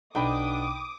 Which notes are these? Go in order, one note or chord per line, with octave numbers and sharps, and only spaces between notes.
B1 D4 D#4 G5 B5 D6 D#6